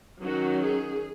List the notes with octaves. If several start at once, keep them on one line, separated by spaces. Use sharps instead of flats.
D#3 F#3 C#4 F#4
G#4